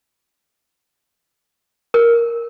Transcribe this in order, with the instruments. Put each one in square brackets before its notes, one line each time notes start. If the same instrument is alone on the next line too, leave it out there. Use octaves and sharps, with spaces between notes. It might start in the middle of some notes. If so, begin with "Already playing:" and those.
[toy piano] A#4